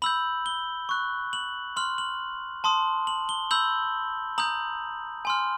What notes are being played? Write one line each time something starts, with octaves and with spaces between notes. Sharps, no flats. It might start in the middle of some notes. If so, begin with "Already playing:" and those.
B5 E6 G6 F#7
G7
C#6 F#6
F#7
C6 F6 F#7
F#7
A5 C6 D#6
F#7
G7
B5 E6 G6 F#7
A#5 D#6 G6 F#7
G#5 C6 F6